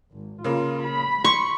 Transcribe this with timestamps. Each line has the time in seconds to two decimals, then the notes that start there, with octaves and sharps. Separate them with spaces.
0.12 G#1
0.44 C#3 A#3 F4
0.87 B5
1.25 C6 C#6